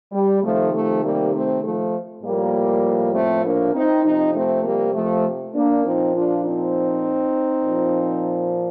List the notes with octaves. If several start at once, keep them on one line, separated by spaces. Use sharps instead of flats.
G3
C3 D#3 F3 A3
F3 A3
G3 A#3
A3 C4
F3 A3
A2 F3 G3 A#3
A3 C4
A#3 D4
C4 D#4
C3 F3 C4 D#4
A3 C4
G3 A#3
F3 A3
A#3 D4
A#2 F3 C4 D#4
D4 F4
C4 D#4
A#2 F3